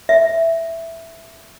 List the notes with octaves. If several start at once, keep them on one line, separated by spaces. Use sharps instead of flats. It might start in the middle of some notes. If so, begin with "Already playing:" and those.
E5